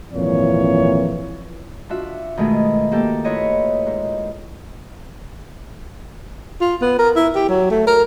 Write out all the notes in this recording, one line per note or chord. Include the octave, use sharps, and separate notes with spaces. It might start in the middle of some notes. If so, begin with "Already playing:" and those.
G#1 F2 A#2 E3 C#5
D4 F4 F#4 E5
B2 D#3 G#3 A3 G#4
A#3 G4 A4
E4 F4 B4 C#5 D#5
G#2
F4
B3
A#4
E4
G4
F#3
A3
A#4